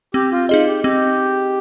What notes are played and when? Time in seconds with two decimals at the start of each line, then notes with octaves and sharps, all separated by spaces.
0.14 C4 G4
0.32 F4
0.49 D#4 F4 G#4 D#5
0.67 G4
0.84 C4 G4